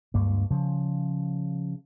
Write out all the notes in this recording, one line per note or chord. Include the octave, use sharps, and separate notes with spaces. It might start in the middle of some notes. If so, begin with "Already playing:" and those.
D2 G2 G#3 A#3
C#3 F3